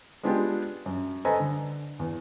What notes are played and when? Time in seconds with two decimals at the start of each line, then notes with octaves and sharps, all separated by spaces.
0.23 G#3 B3 D4 F4 G4 G#4
0.86 F#2
1.25 A4 B4 C5 D#5 G#5 A#5
1.40 D3
1.99 E2